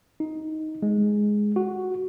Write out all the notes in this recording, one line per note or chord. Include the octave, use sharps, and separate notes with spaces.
D#4
G#3
F#4